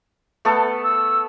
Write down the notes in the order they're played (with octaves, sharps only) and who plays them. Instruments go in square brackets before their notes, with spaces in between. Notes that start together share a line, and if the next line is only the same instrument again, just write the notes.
[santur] A3 B3 A4
[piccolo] E6